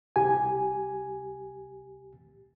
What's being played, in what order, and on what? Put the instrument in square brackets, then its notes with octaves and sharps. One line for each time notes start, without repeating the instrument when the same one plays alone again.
[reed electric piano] C2 G4 G#5